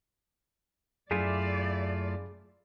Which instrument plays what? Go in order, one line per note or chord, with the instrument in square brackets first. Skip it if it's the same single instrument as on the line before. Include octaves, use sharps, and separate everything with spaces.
[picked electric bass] F#2 [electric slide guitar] A3 E4 F4 [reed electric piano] G#4 [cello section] D5